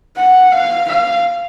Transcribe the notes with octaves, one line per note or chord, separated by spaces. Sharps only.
F#5
F5
F5